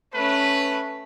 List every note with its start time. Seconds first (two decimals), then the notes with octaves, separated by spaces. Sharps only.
0.14 A3 C#4 B4